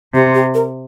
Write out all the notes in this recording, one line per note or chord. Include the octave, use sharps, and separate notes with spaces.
C3 G4
G4
A#4